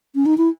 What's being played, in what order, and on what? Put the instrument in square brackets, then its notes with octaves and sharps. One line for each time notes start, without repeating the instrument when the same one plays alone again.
[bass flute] C#4
D#4
E4